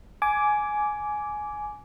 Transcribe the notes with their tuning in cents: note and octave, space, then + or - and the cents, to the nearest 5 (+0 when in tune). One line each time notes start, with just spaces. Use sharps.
G#5 +15 D6 -10